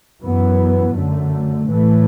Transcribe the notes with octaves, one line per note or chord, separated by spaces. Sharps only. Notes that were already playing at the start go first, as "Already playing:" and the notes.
F#2 E3 B3
F#2 D3 A3
A2 E3 A3